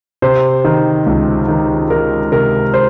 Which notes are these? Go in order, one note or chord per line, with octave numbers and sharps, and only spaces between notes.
C3 C5
D#3
C#2
D#3
D#3 A#4
C3 A#4
C5